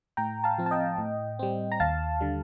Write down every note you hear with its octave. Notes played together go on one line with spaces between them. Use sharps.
A2 G5 A#5
F5 A5
F3 C4
A5
D#5 G5
A2
G3 C4
A#5
D#2 F5 A5
D3 G3